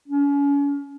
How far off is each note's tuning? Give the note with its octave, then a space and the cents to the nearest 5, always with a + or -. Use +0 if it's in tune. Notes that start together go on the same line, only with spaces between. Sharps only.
C#4 +35